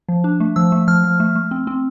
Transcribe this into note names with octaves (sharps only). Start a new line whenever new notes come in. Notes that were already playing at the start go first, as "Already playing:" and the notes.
F3
D4
A3
F3 E6
A3
F3 F6
F3
A3
A3
C4
C4